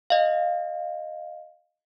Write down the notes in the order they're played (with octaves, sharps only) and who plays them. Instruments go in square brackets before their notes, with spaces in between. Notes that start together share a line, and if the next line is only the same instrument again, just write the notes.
[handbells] D#5 F5